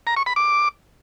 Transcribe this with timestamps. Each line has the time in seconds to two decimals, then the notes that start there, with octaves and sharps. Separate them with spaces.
0.07 A#5
0.17 C#6
0.26 B5
0.36 D6